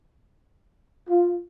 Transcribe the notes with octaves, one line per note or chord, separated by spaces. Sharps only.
F4